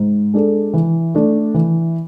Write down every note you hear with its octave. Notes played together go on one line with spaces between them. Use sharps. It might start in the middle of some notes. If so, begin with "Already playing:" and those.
Already playing: G#2
G#3 D4 A4
E3
A3 D4 A4
E3